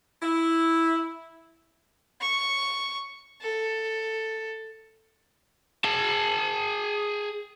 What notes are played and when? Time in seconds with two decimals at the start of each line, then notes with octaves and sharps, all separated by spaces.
0.22 E4
2.21 C#6
3.42 A4
5.85 G#4 A5